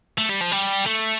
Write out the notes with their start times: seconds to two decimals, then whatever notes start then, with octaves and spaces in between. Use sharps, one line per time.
0.18 A3
0.30 G3
0.41 F3
0.52 G3
0.86 A3